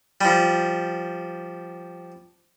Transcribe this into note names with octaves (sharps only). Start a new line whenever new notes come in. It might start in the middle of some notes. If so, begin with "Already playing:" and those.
F3 G3